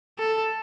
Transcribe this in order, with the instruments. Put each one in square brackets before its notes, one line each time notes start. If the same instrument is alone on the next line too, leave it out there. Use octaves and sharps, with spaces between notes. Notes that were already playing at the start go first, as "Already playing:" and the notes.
[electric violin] A4